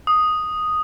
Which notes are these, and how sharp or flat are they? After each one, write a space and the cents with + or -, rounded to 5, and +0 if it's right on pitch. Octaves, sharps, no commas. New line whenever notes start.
D#6 +0